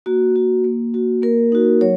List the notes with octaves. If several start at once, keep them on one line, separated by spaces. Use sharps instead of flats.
A#3 F#4
F#4
A#3
F#4
A#3 A#4
D#4 F#4
F#3 C#5